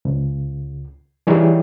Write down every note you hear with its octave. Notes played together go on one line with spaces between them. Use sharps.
C#2
E3 G3 D#4 G#4 C#5